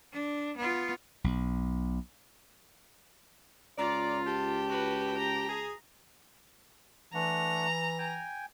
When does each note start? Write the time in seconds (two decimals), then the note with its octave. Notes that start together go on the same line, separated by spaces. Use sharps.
0.13 D4
0.57 B3 F4
1.24 B1
3.78 C#2 F4 D5 A#5
4.26 G4 A5
4.69 F#4 B4
5.17 A#5
5.49 G#4
7.14 E3 A3 D4 F#5 A#5
7.99 G5 G#5